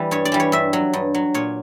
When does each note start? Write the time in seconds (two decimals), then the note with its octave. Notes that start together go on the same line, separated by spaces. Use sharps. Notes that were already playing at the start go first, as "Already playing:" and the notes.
Already playing: E3 G3 B4
0.11 G2 C#5
0.25 D5
0.32 E3 G3
0.40 C#5
0.52 G2 E5
0.73 F#3
0.93 G2
1.15 F#3
1.34 A#2 C#5